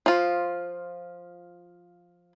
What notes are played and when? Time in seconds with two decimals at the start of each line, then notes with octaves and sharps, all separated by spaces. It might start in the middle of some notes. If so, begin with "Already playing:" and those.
0.06 F3 F4